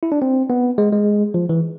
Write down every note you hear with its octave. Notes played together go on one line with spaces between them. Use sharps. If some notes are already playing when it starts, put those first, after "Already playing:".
E4
D4
C4
B3
G#3
G#3
F3
E3